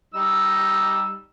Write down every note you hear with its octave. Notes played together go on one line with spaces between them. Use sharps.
G3 D#4 E6